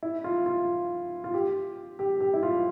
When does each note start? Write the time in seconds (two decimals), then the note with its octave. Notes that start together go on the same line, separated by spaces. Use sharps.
0.03 E4
0.24 F4
0.46 F4
1.24 F4
1.34 G4
1.99 G4
2.20 G4
2.34 E4
2.43 F4